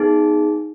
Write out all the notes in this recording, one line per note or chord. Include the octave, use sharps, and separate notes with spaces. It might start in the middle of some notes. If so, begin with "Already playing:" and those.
Already playing: B3 D#4 G#4